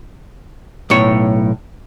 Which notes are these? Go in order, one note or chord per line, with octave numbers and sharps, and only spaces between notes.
B1 A2 C#5